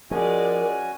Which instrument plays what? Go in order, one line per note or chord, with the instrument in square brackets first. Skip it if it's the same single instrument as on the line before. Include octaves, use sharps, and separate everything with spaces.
[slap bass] F3 [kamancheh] G#3 D5 [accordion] C#4 F#4 G#5 [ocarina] A#4